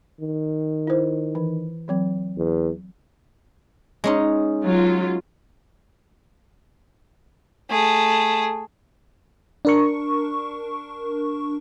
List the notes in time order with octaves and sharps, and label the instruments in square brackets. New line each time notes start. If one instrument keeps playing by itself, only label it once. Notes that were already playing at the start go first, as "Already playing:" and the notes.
[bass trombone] D#3
[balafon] E4 C5
E3
E3 F#3 C4
[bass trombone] E2
[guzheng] G#3 C#4 D#4
[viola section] F#3 F4
[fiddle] A3 G#4
[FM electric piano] D4 A#4 C#6